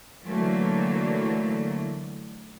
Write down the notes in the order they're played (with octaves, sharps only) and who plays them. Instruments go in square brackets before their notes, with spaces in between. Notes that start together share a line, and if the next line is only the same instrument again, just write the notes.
[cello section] D3 E3 F#3 A3 A#3